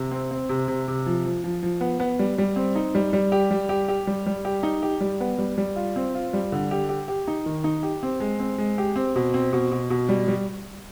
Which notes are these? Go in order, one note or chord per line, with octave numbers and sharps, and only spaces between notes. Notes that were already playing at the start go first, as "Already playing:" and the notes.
Already playing: C3
C4
C4
C3
C3
C3
F3
F3
F3
F3
B3
B3
G3
G3
C4
D#4
G3
G3
G4
G3
G4
G4
G3
G3
G4
D#4
G4
G3
B3
G3
G3
F4
C4
F4
G3
D3
G4
G4
G4
D#4
D#3
D#4
G4
C4
G#3
C4
G#3
G4
C4
B2
C4
B2
B2
B2
G3
G3